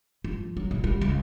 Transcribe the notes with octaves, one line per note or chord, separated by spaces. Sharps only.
F3
F#3
A#2
D#3 G3
C#2